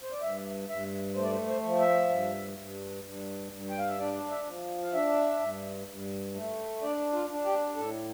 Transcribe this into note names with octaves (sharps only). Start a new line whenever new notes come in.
C5
D5
G2 E5
G2 E5
A3 C5
D5
C5
C5
F3
E5
G2
G2
G2
G2
G5
F5
E5
D4 D5
E5
F3
F5
D4 E5
G2
G2
A3
D4 D5
F4
D4
G4
A2 A4